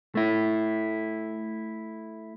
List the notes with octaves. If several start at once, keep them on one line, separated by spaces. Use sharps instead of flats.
A3 E4